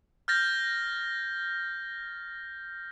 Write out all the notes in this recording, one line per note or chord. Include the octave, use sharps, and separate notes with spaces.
F6 G6 A6 A#6